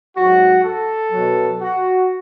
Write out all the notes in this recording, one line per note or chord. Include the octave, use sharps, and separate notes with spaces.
G#2 F#3 F#4
A4
B2 F#3
F#4